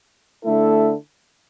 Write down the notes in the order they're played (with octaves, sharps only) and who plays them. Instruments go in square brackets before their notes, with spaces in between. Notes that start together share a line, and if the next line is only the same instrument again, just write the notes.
[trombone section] D3 A3 E4 A4